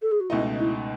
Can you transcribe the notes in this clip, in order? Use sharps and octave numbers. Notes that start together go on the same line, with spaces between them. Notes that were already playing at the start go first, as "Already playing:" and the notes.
A4
G#4
F#4
C#2 B2 A3 D#4 E4
E4